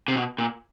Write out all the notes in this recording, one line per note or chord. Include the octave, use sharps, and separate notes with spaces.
C3
B2
A#2